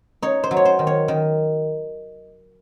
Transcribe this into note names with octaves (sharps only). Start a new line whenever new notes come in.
D#4 C#5
C5
F#3
C#5
C5
D#3
C#5
D#3